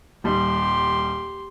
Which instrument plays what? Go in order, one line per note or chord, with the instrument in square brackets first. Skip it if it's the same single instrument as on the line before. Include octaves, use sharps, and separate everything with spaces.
[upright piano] D#1 G3 [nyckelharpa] G4 C6